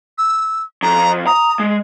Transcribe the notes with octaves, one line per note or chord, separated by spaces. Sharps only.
E6
F2 A#5
A#5 D#6
G#3